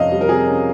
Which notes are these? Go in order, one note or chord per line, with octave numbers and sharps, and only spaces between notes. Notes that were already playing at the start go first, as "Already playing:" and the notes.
Already playing: F2 C3 C#4 D#5 F5
G3
A#4
C3 G#4
C#4